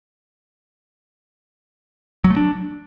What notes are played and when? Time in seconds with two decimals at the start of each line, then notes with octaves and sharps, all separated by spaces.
2.24 F#3
2.30 A3
2.36 D4